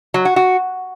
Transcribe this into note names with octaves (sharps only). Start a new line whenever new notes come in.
F#3
F#4
F#4